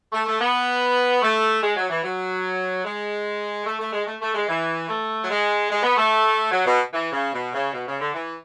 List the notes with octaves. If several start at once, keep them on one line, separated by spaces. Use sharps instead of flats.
A3
A3
B3
A3
G#3
F#3
E3
F#3
G#3
A3
A3
G#3
A3
A3
G#3
E3
A3
F#3
G#3
G#3
B3
A3
F#3
B2
E3
C#3
B2
C#3
B2
C#3
D3
E3